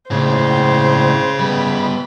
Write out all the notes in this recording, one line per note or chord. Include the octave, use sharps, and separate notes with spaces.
C#2 A2 C#3 C5
G3 B3 B5